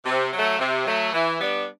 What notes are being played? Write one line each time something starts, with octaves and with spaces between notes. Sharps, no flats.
C3
F#3
A3
C3
F#3 A3
E3
G3 B3 D4